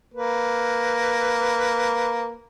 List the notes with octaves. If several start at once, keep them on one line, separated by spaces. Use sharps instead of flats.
A#3 B4